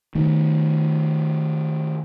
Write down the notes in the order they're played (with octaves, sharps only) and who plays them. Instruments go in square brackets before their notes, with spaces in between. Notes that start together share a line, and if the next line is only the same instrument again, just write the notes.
[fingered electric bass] D#3 A3